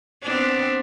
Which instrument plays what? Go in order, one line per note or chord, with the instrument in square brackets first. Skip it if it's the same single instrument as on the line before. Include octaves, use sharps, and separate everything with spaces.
[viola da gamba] B3 C4 D4